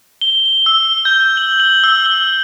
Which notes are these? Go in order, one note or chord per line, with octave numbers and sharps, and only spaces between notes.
G7
G7
E6
G6
F#7
F#7
E6
E6